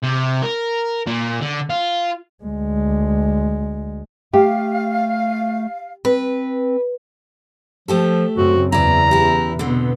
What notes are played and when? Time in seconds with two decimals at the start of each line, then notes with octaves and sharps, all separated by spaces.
0.02 C3
0.42 A#4
1.07 A#2
1.41 D3
1.70 F4
2.44 D2 G#3
4.33 A3 G4 F5
6.05 C4 B4
7.88 F3 A3 G4 A4
8.37 F#2 C#3 C4 F#4
8.72 E2 C#3 E3 E4 D5 A#5
9.11 E4 G4
9.59 B2 D3 B3 C4